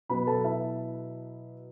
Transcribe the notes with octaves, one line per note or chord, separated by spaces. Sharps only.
B2 F#3 B3 B4 B5
A4 A5
E4 E5